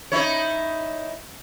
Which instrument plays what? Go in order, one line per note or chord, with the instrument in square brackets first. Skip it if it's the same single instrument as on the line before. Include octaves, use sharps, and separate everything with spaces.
[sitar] D#4 E4 C#5